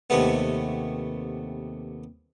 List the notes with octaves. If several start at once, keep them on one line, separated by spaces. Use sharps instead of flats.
D#2 C3 A3 B3